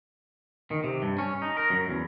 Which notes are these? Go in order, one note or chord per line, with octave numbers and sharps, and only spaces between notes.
D#3
C3
G2
C#4
D#4
A#4
F#2
E2